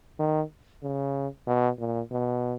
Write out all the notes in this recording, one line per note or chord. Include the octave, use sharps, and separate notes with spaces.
D#3
C#3
B2
A#2
B2